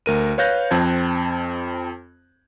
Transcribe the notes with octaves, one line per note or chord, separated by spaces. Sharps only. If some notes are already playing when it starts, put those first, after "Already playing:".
D2 A#4 D#7
B4 C#5 F5 F#6 G6 A#6
F2 C4 A5 G#6